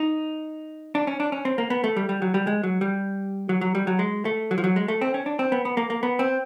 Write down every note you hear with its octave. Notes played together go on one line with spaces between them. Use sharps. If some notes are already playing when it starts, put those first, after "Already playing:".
Already playing: D#4
D4
C#4
D4
C#4
C4
A#3
B3
A3
G3
G3
F#3
G3
G#3
F#3
G3
F#3
F#3
G3
F#3
G#3
A3
F#3
F3
F#3
G#3
A3
C4
C#4
D4
C4
B3
B3
A#3
A#3
B3
C4